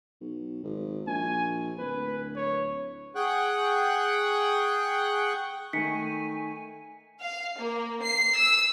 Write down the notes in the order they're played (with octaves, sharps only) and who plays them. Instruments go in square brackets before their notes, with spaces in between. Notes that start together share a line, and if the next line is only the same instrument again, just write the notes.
[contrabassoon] B1
G#1
[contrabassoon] A#1 [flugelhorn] G#5
[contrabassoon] D1 [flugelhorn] B4
[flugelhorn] C#5
[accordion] G#4 F#5 G5 C#6 F#6
[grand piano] D#3 A3 [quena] G#5 [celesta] B6 C#7
[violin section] F5
A#3
C7
E6